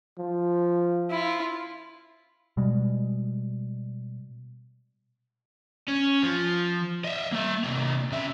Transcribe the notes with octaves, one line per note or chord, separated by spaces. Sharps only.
F3
E4 F4
B2 G3 G#3
C#4
F3
D#5 E5
A#3 E5
C3 A#3
C#3 E5